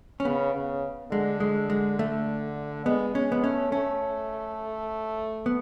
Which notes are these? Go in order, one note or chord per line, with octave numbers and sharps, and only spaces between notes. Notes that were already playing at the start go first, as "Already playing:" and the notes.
C#4
C#3 B3
C#3
D3 G#3
G#3
G#3
A3
G#3 B3
G#3 C#4
B3
A3 C#4
A3 C#4
B3